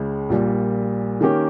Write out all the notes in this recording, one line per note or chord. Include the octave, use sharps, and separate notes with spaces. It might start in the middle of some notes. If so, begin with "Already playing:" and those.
Already playing: C#2 C#3 G#3
A#1 A#2 G3
D#3 A#3 C#4 G4